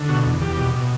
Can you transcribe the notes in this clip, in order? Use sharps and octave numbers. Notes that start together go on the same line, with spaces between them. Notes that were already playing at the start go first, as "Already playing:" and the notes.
Already playing: D3
B2 F#4
E2
E2 G4
B2
B2